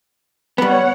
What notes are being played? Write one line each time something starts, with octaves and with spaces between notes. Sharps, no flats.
G3 B3 C#5 F#5